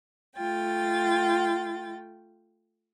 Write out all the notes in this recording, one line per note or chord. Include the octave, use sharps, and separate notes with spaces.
A3 F4 G5 A6